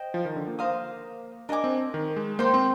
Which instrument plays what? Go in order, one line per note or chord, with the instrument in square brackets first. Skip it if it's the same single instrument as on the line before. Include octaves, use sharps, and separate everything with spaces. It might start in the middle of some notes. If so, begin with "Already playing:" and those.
Already playing: [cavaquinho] C5 D#5 G5
[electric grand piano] F3
D#3
D3
A#3
[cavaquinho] C5 F5 A#5 D#6
[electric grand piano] D4 [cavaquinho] A#4 D#5 G#5 D6
[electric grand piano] C4
D#3
G#3
[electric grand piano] A#3 [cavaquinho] C5 G5 C6
[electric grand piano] C4